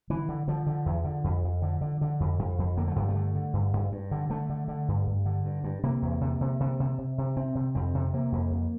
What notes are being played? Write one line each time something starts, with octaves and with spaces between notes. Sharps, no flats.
D3 E3
D3
D3 F3
D3
E2
D3
F2
F2
D3
D3
D3
F2
F2
F2
D3 A#3
A3
G2 G3
A3
D3
D3
G2
G2
G2
D3
D3 A3
D3
D3
G2
G2
D3
G2
G2
C3 A#3
E2
C3
C3
C3
C3
C3
C3
C3 C4
C3
F2 C4
C3
C3 A#3
F2
F2